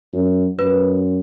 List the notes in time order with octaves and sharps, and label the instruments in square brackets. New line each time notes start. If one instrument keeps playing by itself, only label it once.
[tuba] F#2
[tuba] F#2 [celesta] B4